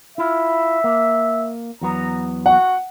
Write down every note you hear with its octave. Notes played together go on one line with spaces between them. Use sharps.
E4 F4 E5
A#3
E2 F#3 B3 A#5
F#4 F#5